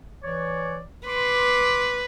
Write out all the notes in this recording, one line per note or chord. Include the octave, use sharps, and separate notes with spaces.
E3 C#5 D5
B4 C6 D6